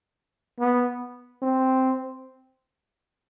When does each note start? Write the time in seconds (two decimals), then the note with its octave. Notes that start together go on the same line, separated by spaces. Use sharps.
0.60 B3
1.42 C4